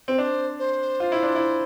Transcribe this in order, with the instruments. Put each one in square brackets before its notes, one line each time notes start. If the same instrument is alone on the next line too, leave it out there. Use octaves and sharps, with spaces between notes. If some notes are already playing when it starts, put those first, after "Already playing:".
[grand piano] C4
[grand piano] D4 [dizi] C5
[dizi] C5
[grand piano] F4
E4
D4
E4